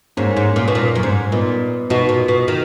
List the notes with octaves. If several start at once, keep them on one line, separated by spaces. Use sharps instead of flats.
G#2 A#3 C#4
G#2
A#2
B2
A#2
F#2
G#2
A#2 B3 D#4
B2 D#4 F#4
A#2
B2
D#3